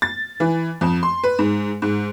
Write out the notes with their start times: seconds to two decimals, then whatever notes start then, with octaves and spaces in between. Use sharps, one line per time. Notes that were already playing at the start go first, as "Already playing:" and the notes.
0.02 A6
0.40 E3
0.81 F2
1.03 C6
1.24 B4
1.39 G#2
1.82 G#2